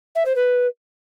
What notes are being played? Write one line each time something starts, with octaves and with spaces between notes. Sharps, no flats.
E5
C5
B4